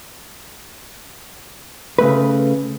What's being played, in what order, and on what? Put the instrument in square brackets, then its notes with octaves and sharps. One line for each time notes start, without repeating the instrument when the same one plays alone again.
[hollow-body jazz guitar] C#3 A3 B4